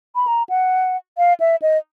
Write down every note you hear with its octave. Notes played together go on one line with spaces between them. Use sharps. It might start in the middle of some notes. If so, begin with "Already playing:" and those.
B5
A#5
F#5
F5
E5
D#5